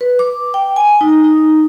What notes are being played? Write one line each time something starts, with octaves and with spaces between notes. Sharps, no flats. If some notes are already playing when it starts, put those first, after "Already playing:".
B4
D6
G5
G#5
D#4
D#4